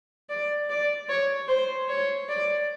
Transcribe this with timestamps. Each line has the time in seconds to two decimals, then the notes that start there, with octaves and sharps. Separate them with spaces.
0.29 D5
0.70 D5
1.09 C#5
1.48 C5
1.89 C#5
2.28 D5